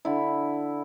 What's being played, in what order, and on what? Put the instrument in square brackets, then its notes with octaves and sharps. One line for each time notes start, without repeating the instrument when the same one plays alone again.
[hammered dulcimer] D3 E4